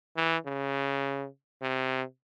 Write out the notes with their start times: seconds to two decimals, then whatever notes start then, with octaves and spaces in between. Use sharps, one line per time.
0.16 E3
0.45 C#3
1.62 C3